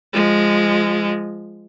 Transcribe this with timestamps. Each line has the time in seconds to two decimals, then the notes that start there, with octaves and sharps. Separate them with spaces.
0.13 F3 G#3